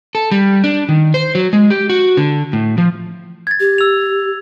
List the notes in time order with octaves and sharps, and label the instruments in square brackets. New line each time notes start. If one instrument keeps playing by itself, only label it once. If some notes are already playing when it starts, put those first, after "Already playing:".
[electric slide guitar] A4
G3
D4
D#3
C5
F#3
G#3
G4
F#4
D3
A2
F3
[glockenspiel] G#6 A6
[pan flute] G4
[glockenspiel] E6 F7